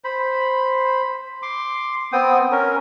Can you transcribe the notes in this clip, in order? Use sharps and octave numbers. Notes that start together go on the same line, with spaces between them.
C5 B5
C6 D6
B3 C4 G5 D#6
C#4 A#4